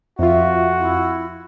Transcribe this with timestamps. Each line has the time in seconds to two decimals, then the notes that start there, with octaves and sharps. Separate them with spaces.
0.19 F2 F4 F#4 E5
0.79 E4